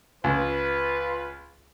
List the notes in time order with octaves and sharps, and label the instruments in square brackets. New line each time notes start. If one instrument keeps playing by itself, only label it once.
[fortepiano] C#2 [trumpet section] F4 B4